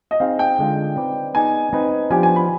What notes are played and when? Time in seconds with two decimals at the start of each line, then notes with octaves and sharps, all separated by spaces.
0.11 D#5
0.20 C4 D#4 G#4 F5
0.39 G5
0.59 D3 G#3 D4 F4
0.96 C4 D#4 B4 D5
1.34 B3 D#4 G#4 D5 G#5
1.73 C4 D#4 B4 D#5
2.10 F3 B3 D4 G4 G#5
2.23 G#5
2.36 B5